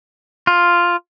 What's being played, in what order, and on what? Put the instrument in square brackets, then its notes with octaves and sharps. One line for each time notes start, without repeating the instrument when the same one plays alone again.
[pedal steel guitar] F4